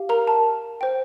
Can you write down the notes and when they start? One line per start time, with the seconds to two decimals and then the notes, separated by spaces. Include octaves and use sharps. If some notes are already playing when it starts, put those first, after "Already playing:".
Already playing: G4 F5
0.09 A#4 A#5
0.27 A5
0.81 C5 G5